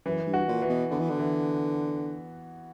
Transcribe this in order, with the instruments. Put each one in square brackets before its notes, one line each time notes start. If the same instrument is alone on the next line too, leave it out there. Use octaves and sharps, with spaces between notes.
[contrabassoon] F#2 [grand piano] E3
[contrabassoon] G2
[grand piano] F#4
[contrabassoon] A#2
[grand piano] E3
[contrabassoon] B2
[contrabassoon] D3 [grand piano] B3
[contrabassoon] E3
D3
[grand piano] E3